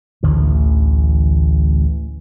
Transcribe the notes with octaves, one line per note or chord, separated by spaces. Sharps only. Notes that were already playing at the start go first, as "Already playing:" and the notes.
A1 D2 D3 E3